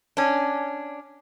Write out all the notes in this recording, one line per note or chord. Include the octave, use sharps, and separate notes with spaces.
C#4 D4